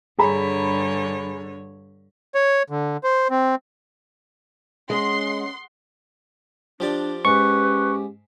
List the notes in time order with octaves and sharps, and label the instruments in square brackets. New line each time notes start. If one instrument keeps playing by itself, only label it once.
[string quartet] G2 D3 C#5 [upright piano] G#4 A#5 B5
[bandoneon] C#5
D3
C5
C4
[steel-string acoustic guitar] G#3 [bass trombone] C#4 [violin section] F#5 C6
[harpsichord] F3 G4 D5 [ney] D4
[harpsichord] G#2 [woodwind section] C#4 G4 [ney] B4 [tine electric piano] C#6